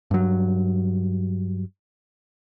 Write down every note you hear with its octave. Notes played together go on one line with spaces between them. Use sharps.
G2 F#3